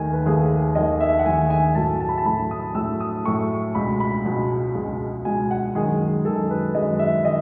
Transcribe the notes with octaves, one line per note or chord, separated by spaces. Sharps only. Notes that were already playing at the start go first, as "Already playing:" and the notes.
Already playing: D#2 D#3 A3 G#5
B4
D#2 D#3 A3 G#4
D#2 D#3 A3 D#5
E5
F#5
D#2 D#3 A3 G#5
G#5
A2 F#3 A3 A5
A5
B5
A5
A2 F#3 A3 B5
D#6
A2 F#3 A3 E6
D#6
A2 F#3 A3 C#6
C#2 B2 G#3 B5
B5
C#2 B2 G#3
C#2 B2 G#3
C#2 B2 G#3 G#5
F#5
F#2 D#3 G#3 G#4
F#2 D#3 G#3 A4
B4
F#2 D#3 G#3 D#5
E5
D#3 D#5